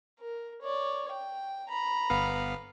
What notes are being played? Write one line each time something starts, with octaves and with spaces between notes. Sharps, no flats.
A#4
C#5 D5
G5
A#5 B5
G1 B3 F5